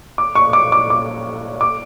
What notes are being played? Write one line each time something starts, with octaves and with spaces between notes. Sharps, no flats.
D6
C#6
D6
D6
D6
D6